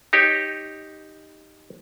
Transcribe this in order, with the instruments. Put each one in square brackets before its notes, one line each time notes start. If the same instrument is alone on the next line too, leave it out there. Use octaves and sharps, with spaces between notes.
[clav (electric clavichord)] D#4 G4 C#5